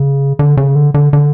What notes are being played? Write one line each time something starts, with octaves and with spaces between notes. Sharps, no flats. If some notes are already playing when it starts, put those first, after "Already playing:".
Already playing: C#3
D3
C#3
D3
D3
D3